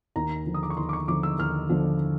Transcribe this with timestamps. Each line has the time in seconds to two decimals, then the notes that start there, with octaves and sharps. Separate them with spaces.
0.16 D#2 A#5
0.46 D3 F3
0.54 D#6
0.63 D6
0.70 C#6
0.77 D#2 C6
0.89 D6
0.93 C#6
1.08 D3 F3 D6
1.23 E6
1.39 D#2 F6
1.69 D3 F3